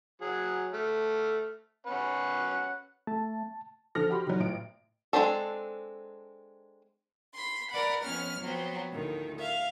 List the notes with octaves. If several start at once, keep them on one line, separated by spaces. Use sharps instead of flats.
F#3 G#4
A3 F6
C#4 B4 F#5
A3 A5
D3 F3 A4 F6 A#6
F#4 G4 B5 C6
D#3 F#3
A1 D7
G#3 A3 C4 D4 A4
B5 C6
A#4 D5 F#5 B5
F2 B3 C#4 F6
F3 F#3 B3 C4
D2 A2 D#3
E5 F5